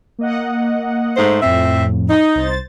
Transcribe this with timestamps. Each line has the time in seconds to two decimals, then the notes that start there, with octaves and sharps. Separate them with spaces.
0.19 A#3 D#5 F#5
1.17 G#2 A3 C5
1.42 F2 A2 C4 E5
2.10 D#4
2.35 C2 C5 A6